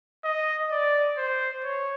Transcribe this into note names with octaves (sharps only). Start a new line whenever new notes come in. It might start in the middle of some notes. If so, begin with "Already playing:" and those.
D#5
D5
C5
C#5